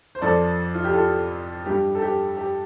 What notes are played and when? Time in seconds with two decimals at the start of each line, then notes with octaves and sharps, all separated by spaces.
0.15 C5
0.22 F2 F3 A4 D5
0.74 F4
0.84 G4
0.93 F4 A4
1.66 G2 G3 G4
1.95 A4
2.02 G4
2.37 G4